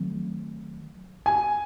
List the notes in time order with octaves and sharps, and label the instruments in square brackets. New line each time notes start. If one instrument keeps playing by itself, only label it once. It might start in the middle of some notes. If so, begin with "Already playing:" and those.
Already playing: [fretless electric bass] D#3 F#3 A3 C4
[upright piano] G#5